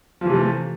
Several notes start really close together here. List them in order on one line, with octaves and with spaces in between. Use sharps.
F3 E3 C3 A3